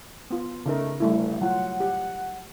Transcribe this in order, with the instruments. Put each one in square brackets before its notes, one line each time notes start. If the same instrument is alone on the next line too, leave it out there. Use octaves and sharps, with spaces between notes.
[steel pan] B3 F4
[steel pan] C#3 D#4 A#4 [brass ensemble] A3
[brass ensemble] G1 [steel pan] G3 A3 E4
[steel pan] F#3 F4 [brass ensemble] F#5
[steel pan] G4